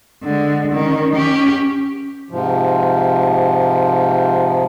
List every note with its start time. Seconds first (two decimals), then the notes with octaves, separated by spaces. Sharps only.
0.24 D3 G#3
0.73 D#3 C#4
1.14 C#4 G4
2.30 G#2 C3 F3